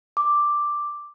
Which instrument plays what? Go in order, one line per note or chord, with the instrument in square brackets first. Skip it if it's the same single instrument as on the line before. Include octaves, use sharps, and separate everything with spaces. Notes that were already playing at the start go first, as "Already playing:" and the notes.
[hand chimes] D6